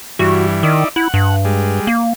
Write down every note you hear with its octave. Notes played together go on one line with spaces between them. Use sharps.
G2 E3 F#4
D#3 D#4 E4 D5
E4 F#5
G2
G3 G#3
A#3